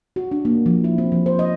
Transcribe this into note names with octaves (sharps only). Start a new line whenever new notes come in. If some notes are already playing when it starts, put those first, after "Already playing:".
F#4
D4
A#3
F3
E4
C4
F3
C5
D#5